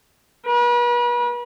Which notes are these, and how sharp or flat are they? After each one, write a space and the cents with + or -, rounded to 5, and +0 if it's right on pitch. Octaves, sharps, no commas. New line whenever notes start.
B4 -40